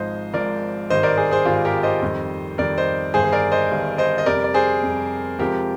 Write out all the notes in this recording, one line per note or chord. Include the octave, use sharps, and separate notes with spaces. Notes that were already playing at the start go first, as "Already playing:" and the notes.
Already playing: G#1 G#2 F3 C5 D#5
G#1 G#2 F3 A#4 D5
G#1 G2 D#3 G3 C5 D#5
A#4 D5
G#4 C5
G#4 C5
G#1 G2 D#3 G3 F4 G#4
G4 A#4
C5 D#5
F2 D#3 G3
F2 D#3 G3 A#4 D5
C5 D#5
G1 G2 D#3 G#4 C5
C5
A#4 D5
C5 D#5
G1 G2 D#3
C5 D#5
D#5
F2 C3 G3 A#4 D5
D5
G#4 C5
F2 C3 G3
F2 C3 F3 G#3 G4 A#4